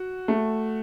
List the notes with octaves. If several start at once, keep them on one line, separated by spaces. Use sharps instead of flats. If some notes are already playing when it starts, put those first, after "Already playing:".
Already playing: F#4
A3